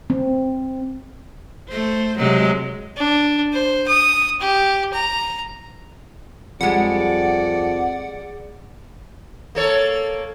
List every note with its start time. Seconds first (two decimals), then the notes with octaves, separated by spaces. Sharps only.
0.10 C4
1.69 A3 C5
2.18 C3 F#3 G#3
2.96 D4
3.53 C5
3.87 D#6
4.41 G4
4.93 A#5
6.61 F2 G3 G#3 D5 F#5
9.55 A#3 A4 C#5